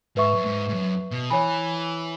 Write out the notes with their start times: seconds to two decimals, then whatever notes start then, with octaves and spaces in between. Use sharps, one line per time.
0.17 G#2 B4 E5 C#6
0.35 F#2
0.46 G#2
0.70 G#2
0.74 F#2
1.11 B2
1.30 E3 C#5 G#5 B5